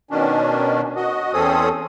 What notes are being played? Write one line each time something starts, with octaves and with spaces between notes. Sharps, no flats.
B2 D#3 C#4 D4
F#4 D#5
E2 C4 C#4 G#4 A4 D#6